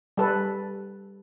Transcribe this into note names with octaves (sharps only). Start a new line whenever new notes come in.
G3 A4 B4